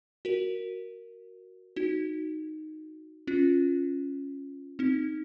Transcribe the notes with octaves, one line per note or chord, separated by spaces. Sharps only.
F#4 A#4
D#4 F#4
C#4 F4
C4 D#4